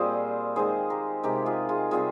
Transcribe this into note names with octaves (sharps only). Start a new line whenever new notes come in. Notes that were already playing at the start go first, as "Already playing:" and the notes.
Already playing: A#2 G3 C4 F4 G#4 C5 D#5
D#3 G#3 C4 G#4 C5
G4 A#4
C3 D#3 G#3 G4 A#4
F4 G#4
F4 G#4
C3 G3 C4 F4 G#4